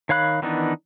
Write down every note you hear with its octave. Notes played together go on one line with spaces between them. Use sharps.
D#3 C#5 F5 B5 F#6
D#3 E3 B3 D4 D#4